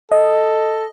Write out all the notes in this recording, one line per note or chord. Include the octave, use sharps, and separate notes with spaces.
A4 D#5